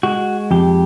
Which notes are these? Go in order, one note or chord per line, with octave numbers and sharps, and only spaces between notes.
G#3 F#4
F2 G4